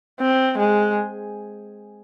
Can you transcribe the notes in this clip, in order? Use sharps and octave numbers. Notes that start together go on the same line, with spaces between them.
C4
G#3